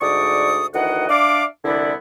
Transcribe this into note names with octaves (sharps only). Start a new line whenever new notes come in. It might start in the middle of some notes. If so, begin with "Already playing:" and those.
D2 G#2 D3 D5 C#6 D#6
D2 D#3 E3 D#5 F#5
D4 D5 E5 F5 D6
C2 D3 E3 B3 E4 D5